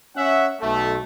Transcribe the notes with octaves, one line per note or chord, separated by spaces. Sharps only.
C#4 E5 F#5
B1 A3